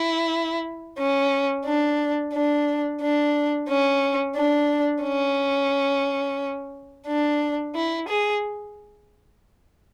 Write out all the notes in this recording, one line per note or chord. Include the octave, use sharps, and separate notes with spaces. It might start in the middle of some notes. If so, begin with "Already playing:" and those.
Already playing: E4
C#4
D4
D4
D4
C#4
D4
C#4
D4
E4
G#4